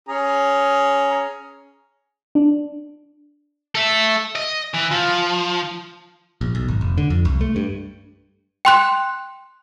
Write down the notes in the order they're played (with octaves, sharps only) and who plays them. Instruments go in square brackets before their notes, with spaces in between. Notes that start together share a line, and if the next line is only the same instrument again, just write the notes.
[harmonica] C#4 G#4 A#5
[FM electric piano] D4
[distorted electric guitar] A4 E5
D#5
E3
F3
[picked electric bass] A#1
B1
G#1
F1
D3
F2
C2
A3
G2
[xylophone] G5 C6 F#6